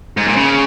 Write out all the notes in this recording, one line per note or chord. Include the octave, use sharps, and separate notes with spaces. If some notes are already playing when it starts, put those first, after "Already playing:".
G#2
A#2
C#3